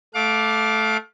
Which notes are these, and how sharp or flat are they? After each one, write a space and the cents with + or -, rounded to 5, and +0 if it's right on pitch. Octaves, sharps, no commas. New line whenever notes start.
A3 -10 F5 +25 D6 +0